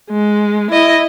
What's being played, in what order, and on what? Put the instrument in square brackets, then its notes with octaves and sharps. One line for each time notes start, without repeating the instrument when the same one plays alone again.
[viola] G#3
E4 D#5